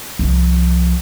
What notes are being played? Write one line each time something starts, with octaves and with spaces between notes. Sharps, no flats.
C2 F3